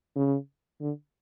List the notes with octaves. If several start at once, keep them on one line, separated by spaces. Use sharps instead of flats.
C#3
D3